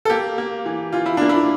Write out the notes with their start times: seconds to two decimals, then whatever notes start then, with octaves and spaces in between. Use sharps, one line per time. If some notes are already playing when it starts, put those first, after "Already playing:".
0.05 A4
0.10 A#3 G4
0.38 A#3
0.66 E3
0.93 E3 F4
1.06 E4
1.17 A#3 D4
1.29 E4